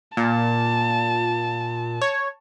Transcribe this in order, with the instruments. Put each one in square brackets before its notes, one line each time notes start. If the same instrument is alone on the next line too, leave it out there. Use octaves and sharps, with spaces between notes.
[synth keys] A#2 [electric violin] A5
[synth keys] C#5